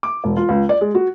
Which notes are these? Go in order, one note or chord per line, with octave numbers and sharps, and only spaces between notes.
D6
E1
F4
C#2
D5
G#3
F#4